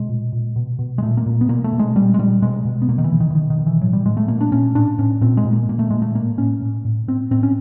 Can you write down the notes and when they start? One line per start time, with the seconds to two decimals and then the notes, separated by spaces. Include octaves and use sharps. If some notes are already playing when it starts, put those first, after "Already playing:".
Already playing: B2 G#3
0.09 A#2
0.32 A#2
0.56 B2
0.79 B2
0.98 G#3
1.02 A#2 A3
1.17 A#3
1.26 A#2
1.41 B3
1.49 B2 A#3
1.64 A3
1.72 B2
1.79 G#3
1.95 A#2 G3
2.14 G#3
2.19 A#2 G3
2.42 B2 G#3
2.65 B2
2.82 B3
2.89 B2 A#3
2.98 D#3
3.04 E3
3.12 B2
3.20 D#3
3.30 E3
3.35 B2 D#3
3.50 D#3
3.58 B2
3.67 E3
3.82 A2 F#3
3.93 G3
4.05 A2 G#3
4.17 A3
4.28 A#2 A#3
4.41 D4
4.52 A#2 C#4
4.75 A2 D4
4.98 A2 C#4
5.21 A#2 C4
5.37 G#3
5.45 A#2
5.53 A#3
5.69 A#2 A#3
5.79 A3
5.90 A#2 G#3
6.02 A3
6.15 A2 A#3
6.38 A2 C#4
6.62 A2
6.85 A2
7.08 A2 C4
7.31 A2 C4
7.43 C#4